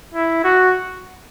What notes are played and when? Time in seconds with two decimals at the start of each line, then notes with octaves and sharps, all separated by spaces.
0.15 E4
0.44 F#4